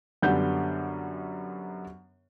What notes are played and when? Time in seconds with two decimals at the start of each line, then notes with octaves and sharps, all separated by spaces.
0.22 F#2 D3 G3 B3 F#5 G6